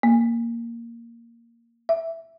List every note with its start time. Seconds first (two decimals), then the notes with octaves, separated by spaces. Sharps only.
0.03 A#3
1.89 E5